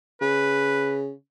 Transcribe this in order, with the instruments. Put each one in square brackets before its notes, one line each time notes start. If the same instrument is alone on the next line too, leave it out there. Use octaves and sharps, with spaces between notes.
[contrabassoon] C#3 [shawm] B4